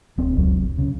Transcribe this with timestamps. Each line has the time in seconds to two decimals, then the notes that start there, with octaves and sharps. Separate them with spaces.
0.18 D1 C4
0.36 F1 C#2 F#3
0.78 C#3